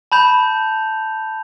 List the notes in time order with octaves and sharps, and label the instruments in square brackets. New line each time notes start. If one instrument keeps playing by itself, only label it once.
[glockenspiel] A5 B5 G6 F7